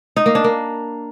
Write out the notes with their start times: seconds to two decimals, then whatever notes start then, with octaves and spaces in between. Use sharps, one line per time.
0.16 D#4
0.26 A#3
0.35 D4
0.44 A#3